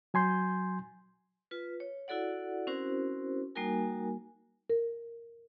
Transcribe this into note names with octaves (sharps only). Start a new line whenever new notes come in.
F#3 G#5 C6 G6
F4 B4
C#5
E4 F#4 A4 D5 F#5
C4 C#4 E4 F#4 A#4 C5
G3 A#3 D#4 F#4 A#4 G#5
A#4